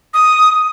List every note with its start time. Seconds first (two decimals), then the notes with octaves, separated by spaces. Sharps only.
0.14 D#6